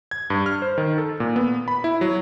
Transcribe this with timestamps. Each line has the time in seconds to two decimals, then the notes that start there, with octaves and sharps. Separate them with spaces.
0.11 G#6
0.30 G2
0.46 F6
0.62 C5
0.78 D#3
0.98 A4
1.20 A#2
1.36 B3
1.68 B5
1.84 E4
2.01 F#3